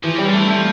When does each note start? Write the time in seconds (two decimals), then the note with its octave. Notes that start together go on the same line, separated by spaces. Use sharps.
0.03 E3 F3
0.15 E3 G3
0.25 D3
0.33 A3
0.37 E3
0.48 F3 A3